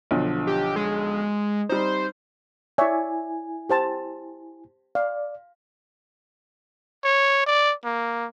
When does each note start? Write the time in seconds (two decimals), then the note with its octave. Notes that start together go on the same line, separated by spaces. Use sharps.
0.11 B1 D3 F3
0.47 G4
0.76 G#3
1.69 G3 C4 D#4 C5
2.78 E4 C#5 D5 E5 G#5
3.70 G4 C5 A5
4.95 D5 F5
7.04 C#5
7.47 D5
7.85 A#3